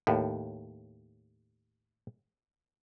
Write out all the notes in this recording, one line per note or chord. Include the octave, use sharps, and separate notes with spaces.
D#2 A2